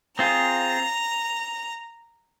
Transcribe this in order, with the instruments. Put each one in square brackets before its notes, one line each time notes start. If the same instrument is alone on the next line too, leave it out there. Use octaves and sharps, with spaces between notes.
[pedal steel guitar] C4 F4 G#4 [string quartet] A#5